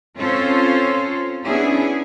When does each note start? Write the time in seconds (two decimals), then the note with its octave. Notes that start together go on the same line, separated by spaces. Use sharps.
0.18 C4 C#4 F4 A4 C5 C#5
1.43 B3 C#4 D4 E4 G#4